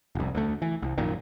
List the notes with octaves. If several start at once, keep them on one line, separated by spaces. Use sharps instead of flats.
F1 C2
D2 A3
E3
C2
A#1 F#2 A#2 D#3